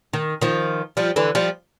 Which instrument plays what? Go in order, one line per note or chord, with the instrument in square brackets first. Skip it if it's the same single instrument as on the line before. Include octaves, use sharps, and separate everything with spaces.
[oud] D#3
D#3 F3
F3 G3
D3 E3
F3 G3